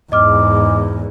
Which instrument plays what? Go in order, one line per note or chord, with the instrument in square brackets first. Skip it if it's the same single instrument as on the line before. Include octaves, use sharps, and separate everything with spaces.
[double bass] E2 G#2 [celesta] D#5 D6 F6